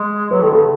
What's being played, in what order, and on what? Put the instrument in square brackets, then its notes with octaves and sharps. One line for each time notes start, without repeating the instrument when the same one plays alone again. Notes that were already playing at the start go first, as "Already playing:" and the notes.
Already playing: [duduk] G#3
[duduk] F#3 [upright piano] B4
[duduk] D#3 [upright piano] A4
[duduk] C#3 [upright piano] A4